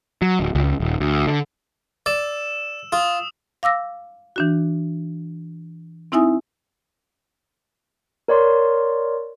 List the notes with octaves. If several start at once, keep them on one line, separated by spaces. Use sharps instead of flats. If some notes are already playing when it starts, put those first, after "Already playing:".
F#3
D1
C#2
D#1
D2
D3
D5 E6 E7
F4 D#6
F5 D6 E6 A#6
E3 D4 F#4
C4 D#4 E4 E5 G#5 D#6
A#4 C#5 D5 C6